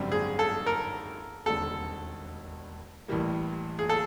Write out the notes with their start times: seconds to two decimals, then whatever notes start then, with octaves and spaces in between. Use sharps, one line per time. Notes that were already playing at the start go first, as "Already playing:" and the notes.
Already playing: G#1 F#2 D3 G3 C4
0.12 G#4
0.39 A4
0.66 A#4
1.46 E1 D#2 D3 G3 C4 A4
3.08 A1 A2 E3 G3 A#3
3.79 G#4
3.89 A4